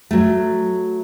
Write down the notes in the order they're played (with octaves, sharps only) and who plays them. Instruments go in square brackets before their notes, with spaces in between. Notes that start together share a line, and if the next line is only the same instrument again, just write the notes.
[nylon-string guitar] F#3 A3